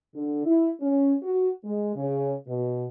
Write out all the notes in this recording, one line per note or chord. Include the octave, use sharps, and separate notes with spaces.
D3
E4
C#4
F#4
G#3
C#3
B2